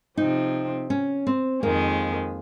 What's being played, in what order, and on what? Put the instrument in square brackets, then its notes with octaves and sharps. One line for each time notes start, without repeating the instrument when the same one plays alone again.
[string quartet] C3 F3 C4 [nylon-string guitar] D#4
[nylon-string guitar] C#4
C4
[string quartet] F2 D#3 G#3 [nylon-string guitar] A#3